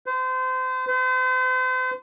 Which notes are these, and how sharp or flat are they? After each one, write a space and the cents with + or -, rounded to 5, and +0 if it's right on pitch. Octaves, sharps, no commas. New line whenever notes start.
C5 -30
C5 -40